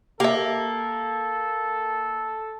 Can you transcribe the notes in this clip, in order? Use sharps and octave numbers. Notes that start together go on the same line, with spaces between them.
A#3 G4 A4 E5